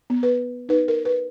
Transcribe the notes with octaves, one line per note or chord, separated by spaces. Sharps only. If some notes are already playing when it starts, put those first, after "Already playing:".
B3
B4
D#4 B4
A#4
B4